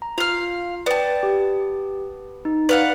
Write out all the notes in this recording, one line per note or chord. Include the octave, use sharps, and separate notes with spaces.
A#5
F4 F5 F6 C7
B3 D5 G5 A5
G4
D#4
B4 D5 F5 F#5